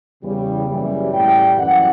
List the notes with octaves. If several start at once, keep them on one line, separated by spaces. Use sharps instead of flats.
E2 C#3 G3
F#1 F#2 C#3 E3 G3
A1 A2 E3 G3 G5
F#2 E3 G3 F#5